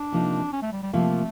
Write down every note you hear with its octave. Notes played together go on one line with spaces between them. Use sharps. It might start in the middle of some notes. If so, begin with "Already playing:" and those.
Already playing: D4
C3 F3 A#3 D#4
C#4
A3
G3
G3
C3 F3 A3 A#3